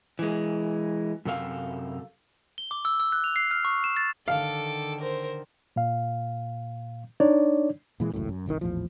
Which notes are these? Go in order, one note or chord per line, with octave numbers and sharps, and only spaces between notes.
E3 G#3
F#2 C3 A4 F5
G7
D6
E6
E6
F#6
F7
C7
F6
C#6
E7
A6
D3 D#3 A4 F5 D6
A#4 C5
A#2 F5
D4 D#4 C#5 D5
A#2 E3 G#3
G#1 C#2 F#2 A2
F#2
G1 C2 D3 D#3
A#1 E2 A2 F3